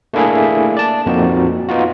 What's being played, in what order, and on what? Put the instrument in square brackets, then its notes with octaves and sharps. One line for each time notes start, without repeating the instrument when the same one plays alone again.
[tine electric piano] A3 A#3 D4 E4 G#4 E5
D5 A5
F2 A#2 C4 D#4 F#4
B3 D#4 F4 F#4